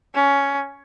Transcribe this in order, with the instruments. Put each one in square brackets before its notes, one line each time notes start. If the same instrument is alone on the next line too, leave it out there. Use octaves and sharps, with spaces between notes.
[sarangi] C#4